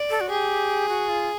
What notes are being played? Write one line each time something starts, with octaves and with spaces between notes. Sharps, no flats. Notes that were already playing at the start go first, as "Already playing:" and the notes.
Already playing: D5
A4
F#4
G4 G#4
F#4
F4